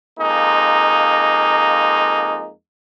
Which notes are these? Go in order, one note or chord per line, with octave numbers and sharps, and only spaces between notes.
F2 G#3 A#3 D#4